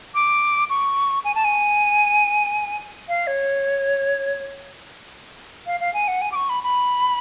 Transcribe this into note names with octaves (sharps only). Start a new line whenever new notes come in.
D6
C#6
G#5
A5
G#5
F5
C#5
F5
F5
G#5
F#5
G#5
D6
C#6
B5
B5